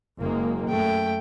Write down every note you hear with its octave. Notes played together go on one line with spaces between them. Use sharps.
F#1 G#3 A#3
F#2 A3 G5